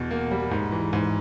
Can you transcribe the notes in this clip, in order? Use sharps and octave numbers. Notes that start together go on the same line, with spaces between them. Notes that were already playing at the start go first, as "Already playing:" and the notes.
Already playing: E2 B2
A#3
G3
G#2
E3
G#2